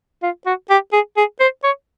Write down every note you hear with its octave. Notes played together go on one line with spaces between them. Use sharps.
F4
F#4
G4
G#4
G#4
C5
C#5